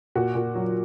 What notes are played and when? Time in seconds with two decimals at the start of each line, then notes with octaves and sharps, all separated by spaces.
0.15 A#2 F#4
0.35 A#2
0.55 F#3